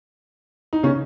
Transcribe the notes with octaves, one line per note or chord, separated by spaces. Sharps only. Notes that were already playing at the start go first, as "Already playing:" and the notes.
D#4
C#3 C#4